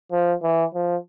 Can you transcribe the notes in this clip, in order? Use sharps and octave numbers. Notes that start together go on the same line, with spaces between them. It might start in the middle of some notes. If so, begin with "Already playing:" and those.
F3
E3
F3